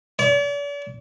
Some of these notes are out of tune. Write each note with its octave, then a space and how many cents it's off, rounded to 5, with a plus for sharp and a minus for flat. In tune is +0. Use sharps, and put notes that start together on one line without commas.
D5 -45